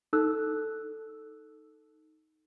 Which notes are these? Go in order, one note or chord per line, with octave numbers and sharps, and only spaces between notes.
D#4 A4 E6 F#6